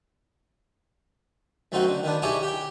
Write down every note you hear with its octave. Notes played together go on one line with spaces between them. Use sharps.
F#2 A3 C4 D#4 F#4
D3
D#3 B3 D4
D#4 E4 G4 G#4 C#5 D5
G4 G5